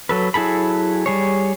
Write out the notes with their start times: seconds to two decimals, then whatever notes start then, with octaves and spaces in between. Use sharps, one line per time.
0.09 F#3 A4 B4
0.34 F#3 E4 G#4 A4 B5
1.06 G3 G#4 C#5